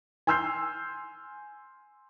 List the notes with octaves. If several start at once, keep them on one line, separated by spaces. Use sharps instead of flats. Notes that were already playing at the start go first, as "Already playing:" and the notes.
G#5 C6 E6 F6 G6 C7